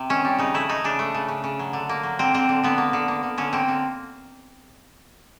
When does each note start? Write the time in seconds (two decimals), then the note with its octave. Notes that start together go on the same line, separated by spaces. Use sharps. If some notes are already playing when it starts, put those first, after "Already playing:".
Already playing: C3
0.10 D#3 C#4
0.25 G3
0.39 C#3 D#4
0.54 A3 E4
0.69 A3 D#4
0.84 C#3 D4
0.99 A3
1.14 C#3
1.28 C#3
1.44 C#3
1.59 F#3
1.73 D3
1.89 A#3
2.03 F#3
2.19 D3 C4
2.34 D3 C4
2.49 D3
2.64 D3 B3
2.78 A#3
2.93 D3
3.08 A#3
3.23 D3
3.38 D3 C#4
3.53 A#3 C4
3.68 D3